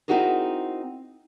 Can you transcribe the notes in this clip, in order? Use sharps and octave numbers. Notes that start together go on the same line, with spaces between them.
C4 D#4 E4 F#4 G#4 A#4